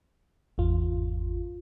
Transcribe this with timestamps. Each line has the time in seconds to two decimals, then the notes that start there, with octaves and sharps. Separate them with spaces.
0.58 G#1 E2 F4